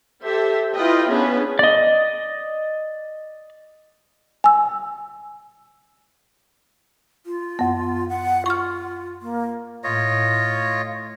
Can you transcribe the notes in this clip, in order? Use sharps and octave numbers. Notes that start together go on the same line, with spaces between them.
G4 A4 C5 E5
E4 F4 B4 D#5 G5
B3 C#4 D4 G#4 B4
D5 D#5
G#5 E6
F4
F#2 B3
F#5
F4 C#6 F6
A#3
A2 F4 C#5 D#5